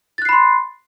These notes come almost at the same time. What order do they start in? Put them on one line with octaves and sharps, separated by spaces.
A6 F#6 C7 B5 C6